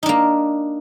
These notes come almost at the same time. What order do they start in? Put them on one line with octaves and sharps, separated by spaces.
D#4 D4 A#3